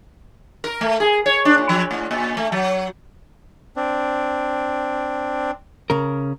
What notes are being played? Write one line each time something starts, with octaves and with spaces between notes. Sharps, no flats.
A#4
A3
G#4
C#5
D4
A#2
F3
A2
A#2
A3
F#3
C4 D4
C#3 A#4